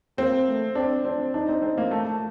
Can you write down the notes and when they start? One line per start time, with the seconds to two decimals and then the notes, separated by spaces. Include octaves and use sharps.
0.18 A#3 C4
0.47 A3
0.75 C4 D4
1.05 C4 D4
1.34 D4 D#4
1.49 C4
1.62 C4
1.78 A#3
1.91 A3
2.05 A3